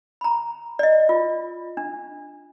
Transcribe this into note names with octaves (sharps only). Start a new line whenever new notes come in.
A#5 B5
D5 D#5
F4
D4